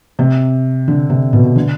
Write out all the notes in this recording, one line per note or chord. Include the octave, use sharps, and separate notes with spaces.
C3
D3
C3
B2
D3